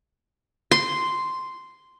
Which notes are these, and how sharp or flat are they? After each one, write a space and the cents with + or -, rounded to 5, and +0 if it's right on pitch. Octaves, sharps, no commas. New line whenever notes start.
C6 -5